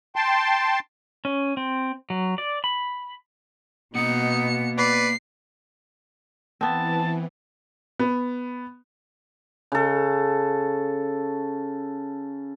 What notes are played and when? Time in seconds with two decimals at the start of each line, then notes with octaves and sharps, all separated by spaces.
0.16 G5 A5 C6
1.25 C#4
1.57 C4
2.10 F#3
2.38 D5
2.64 B5
3.95 B2 A#3 B3 D#4 F#5 C#7
4.78 B4 D5 C7
6.61 E3 B3 C4 A5
7.99 B3
9.72 C#3 A4